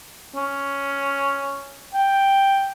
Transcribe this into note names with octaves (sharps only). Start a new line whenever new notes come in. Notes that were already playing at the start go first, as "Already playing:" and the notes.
C#4
G5